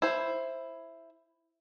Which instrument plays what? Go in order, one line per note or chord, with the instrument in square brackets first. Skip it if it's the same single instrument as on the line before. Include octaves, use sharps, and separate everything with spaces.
[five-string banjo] E4 C5